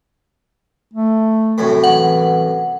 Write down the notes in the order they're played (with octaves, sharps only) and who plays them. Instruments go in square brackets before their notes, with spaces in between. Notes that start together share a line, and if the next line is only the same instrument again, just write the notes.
[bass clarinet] A3
[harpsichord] C2 F#2 A2
[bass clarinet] E3 [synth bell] F#5